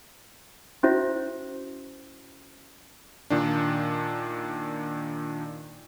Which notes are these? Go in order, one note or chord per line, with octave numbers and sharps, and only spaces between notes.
C#4 E4 F#4 C5 E5
A#2 D#3 D4